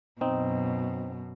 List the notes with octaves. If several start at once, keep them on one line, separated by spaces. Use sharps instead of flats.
F#2 B2 C4 D#4